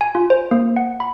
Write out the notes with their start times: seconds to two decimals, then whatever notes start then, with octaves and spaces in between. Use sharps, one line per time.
0.01 G#5
0.15 F4
0.30 C5
0.51 A#3
0.76 F#5
1.00 B5